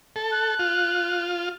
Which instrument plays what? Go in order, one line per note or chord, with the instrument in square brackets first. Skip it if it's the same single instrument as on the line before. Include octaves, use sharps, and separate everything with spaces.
[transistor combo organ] A4
[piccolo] F#6
[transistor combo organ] F4